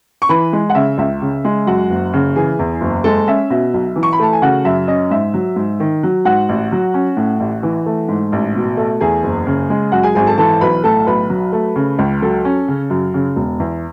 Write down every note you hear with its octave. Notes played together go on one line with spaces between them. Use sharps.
C#6
E3 B4 B5
G#3
F#5
C#3 E5
C#2 E5
C#3
G#3
F#2 F#4 F#5
F#1
C#3
E3 G#4 G#5
E2
F#1
G#3 A4 A5
C#4 E5
B2 E5
B1
E3
C#6
B5
A3 A5
G#5
C#3 F#4 F#5
F#2 E5
C#4 D#5
G#2 E5
F#3
G#2
D#3
F#3
G#2 F#4 F#5
A1
F#3
C#4
A2
A1
E3
A3
G#2
A1
B2
A3
E2 G#4 G#5
F#1
C#3
G#3
F#2 F#4 F#5
G#4 G#5
G#1 G#4 G#5
A4 A5
E3 A4 A5
B1 B4 B5
A2 A4 A5
B1 B4 B5
F#3
A3
C#3
C#2
F#3 A4 A5
C#4
C#3
F#2
C#3
E1
E2